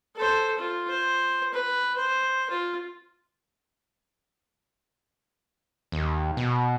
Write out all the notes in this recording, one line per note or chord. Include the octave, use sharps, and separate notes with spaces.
A4 C5
F4
C5
B4
C5
F4
D#2
B2